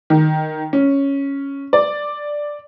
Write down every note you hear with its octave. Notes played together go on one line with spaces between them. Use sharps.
D#3
C#4
D5